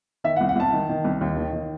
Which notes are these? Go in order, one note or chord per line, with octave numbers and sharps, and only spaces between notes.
D#3 E5
F#5
C2
F#5
C2 A5
D#3
D#3
C2
D#2
D#3
D#3